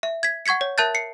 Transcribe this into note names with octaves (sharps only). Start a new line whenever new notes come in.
E5
G#6 B6
F#5 C#6 G#6 B6 C#7
C#5
A#4 E5 A5 F#6 G6 A6
C7 C#7